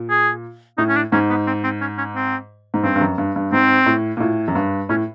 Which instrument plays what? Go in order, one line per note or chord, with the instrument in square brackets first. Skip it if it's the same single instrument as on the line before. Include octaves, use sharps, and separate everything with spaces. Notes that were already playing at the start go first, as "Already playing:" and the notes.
Already playing: [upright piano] A#2
[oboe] G#4
[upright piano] A2 [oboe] D#4
[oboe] C#4
D4
[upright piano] G#2 [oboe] C#4
[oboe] B3
C4
C4
C#4
C#4
C4
[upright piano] G#2
[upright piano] G2 [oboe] C4
[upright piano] G2
F#2
G2
G2
[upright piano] G#2 [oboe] C4
[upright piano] A2
A#2
A2
F#2
G2
[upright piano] A2 [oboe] C#4